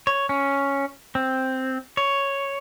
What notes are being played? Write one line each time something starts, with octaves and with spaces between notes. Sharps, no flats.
C#5
C#4
C4
C#5